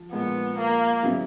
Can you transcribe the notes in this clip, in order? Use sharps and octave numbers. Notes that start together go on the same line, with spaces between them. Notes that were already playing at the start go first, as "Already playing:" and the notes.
Already playing: F3
A#2 F3 G#3 B3
A#3
C#3 F#3 B3 E4